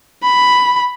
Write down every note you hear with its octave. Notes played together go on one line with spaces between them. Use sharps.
B5